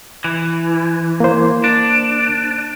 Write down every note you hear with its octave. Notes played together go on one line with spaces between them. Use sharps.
E3
A#3 C5
D4